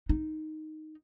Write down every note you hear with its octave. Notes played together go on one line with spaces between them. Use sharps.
D#4